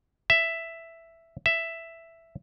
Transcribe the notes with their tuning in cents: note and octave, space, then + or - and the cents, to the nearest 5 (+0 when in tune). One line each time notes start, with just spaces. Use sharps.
E5 +5
E5 +5